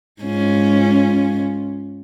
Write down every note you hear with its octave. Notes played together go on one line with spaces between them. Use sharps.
G#2 C#4 F4